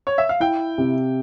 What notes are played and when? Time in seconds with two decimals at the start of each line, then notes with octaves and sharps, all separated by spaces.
0.07 C#5
0.18 E5
0.29 F5
0.40 E4 G5
0.78 C3